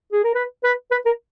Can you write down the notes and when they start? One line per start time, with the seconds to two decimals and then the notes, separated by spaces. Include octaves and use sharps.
0.13 G#4
0.24 A#4
0.35 B4
0.64 B4
0.92 B4
1.06 A#4